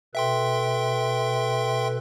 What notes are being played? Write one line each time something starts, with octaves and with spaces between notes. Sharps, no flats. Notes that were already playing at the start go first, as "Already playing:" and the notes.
B2 A4 B4 E5 G5 C6